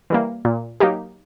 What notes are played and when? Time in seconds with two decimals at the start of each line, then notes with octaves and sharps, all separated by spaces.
0.10 E3 G3 A#3
0.45 A#2
0.80 F#3 A#3 D#4 G4